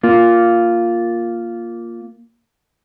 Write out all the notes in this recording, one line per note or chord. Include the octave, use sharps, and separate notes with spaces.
A#3 F4